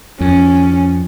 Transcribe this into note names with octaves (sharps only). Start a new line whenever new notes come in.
F2 C#4